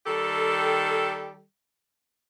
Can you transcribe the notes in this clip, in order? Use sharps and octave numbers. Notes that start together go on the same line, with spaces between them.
D#3 G3 G4 A4